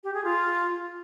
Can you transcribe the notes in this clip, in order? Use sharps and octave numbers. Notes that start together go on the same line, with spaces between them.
G4
G#4
F4